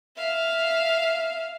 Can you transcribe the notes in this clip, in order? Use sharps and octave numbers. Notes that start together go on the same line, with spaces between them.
E5 F5